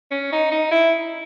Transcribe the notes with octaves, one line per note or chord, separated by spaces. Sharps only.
C#4
D#4
D#4
E4